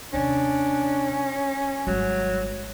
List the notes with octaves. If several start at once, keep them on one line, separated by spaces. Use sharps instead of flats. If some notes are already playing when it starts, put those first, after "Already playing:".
D#2 C3 C#4 D4
G#1 F#3 G3